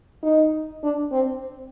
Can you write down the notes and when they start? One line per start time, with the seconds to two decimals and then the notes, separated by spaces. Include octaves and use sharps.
0.23 D#4
0.83 D4
1.12 C4